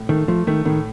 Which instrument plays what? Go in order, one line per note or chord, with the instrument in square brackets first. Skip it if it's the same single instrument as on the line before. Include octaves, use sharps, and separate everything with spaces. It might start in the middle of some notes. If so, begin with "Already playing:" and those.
Already playing: [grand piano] A2
[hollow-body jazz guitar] D#3 [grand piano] A3
[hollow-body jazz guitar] F3 [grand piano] A3
[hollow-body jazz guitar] D#3 [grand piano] A3
[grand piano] A2 [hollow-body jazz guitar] D#3